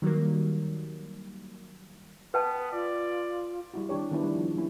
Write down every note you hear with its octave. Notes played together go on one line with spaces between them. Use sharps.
D#3 F#3 G3 A#3
B3 B4 G5 A5
F4 D5
G3 E4 F#4
D#3 E3 D4 G4 C#5
D#3 E3 B3 D4 E4
G3 D#4 E4
F3
E3 F#3 A#3 C#4 E4